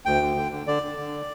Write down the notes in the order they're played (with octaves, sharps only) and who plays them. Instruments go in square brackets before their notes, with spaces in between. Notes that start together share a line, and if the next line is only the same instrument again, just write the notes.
[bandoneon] D2 G5
D3
D3
D3
D3 D5
D3
D3